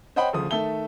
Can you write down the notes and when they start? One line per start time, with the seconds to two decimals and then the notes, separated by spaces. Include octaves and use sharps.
0.16 C5 C#5 D#5 F#5 G5 B5
0.33 D2 C#3 F3 D#6
0.51 D#3 A3 E5 A5 G7